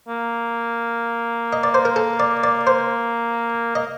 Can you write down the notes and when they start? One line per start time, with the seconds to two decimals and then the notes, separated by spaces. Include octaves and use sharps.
0.09 A#3
1.53 D#5
1.64 D5
1.74 C5
1.85 A#4
1.96 A4
2.20 D5
2.44 D5
2.67 C5
3.75 A#3 D#5